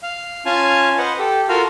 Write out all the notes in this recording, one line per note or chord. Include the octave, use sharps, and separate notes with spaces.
F5
C#4 F4 F5 G#5 A5
B4 C5 D#5 F#5
G4 A4
F4 F#4 A4 A#4 F5